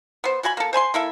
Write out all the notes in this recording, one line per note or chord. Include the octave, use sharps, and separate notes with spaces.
B3 C5
B2 F#4 G#5 B5
A#3 A4
C5 G#5 B5 C6
A#3 E4 A4 E5